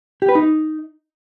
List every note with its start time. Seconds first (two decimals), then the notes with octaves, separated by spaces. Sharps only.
0.22 G4
0.29 B4
0.35 D#4